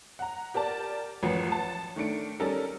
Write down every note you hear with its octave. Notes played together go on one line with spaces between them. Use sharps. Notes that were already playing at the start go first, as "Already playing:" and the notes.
F#5 A#5
G4 A#4 D5 A5
A1 F#2 F3 F#4 B4 C#7
A5
D#3 A3 D4 C#7 D7
G3 C#4 D#4 A4 A#4